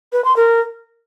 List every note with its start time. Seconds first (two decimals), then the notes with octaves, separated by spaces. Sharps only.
0.13 B4
0.25 C6
0.36 A#4